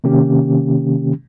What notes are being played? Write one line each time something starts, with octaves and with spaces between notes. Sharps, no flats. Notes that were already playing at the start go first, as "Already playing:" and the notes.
C3 D#3 A#3 C#4 G4